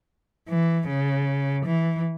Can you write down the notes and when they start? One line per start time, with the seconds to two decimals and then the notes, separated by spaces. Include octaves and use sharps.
0.49 E3
0.88 C#3
1.65 E3